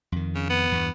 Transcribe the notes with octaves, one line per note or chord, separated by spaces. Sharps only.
F2 D#3
C#3
B3
E2 G2